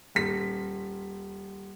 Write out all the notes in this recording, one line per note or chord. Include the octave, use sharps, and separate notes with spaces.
D#1 B6